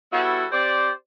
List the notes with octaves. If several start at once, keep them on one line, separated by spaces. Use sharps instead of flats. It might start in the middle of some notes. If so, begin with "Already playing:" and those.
G3 B3 E4 F#4 A4 C#5
C4 G4 C5 D5